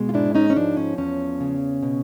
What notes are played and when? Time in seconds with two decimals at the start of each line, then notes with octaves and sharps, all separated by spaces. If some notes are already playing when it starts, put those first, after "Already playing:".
Already playing: B2 G#3
0.09 F4
0.14 G#2 D4 E4
0.35 C#4 D#4
0.50 C#4
0.56 F3 D4
0.77 C#4
0.98 E2 C#4
1.40 C#3
1.83 B2